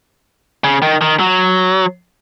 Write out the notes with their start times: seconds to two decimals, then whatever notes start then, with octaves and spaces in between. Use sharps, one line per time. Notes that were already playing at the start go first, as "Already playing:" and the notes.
0.64 C#3
0.82 D#3
1.01 D#3
1.20 F#3